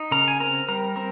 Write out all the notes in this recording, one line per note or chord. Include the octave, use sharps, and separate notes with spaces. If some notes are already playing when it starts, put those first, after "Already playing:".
Already playing: D#4
C#3 A#4 A#5
G#5
C4 A#4 A#5
G3 A#4 A#5
C4 A#4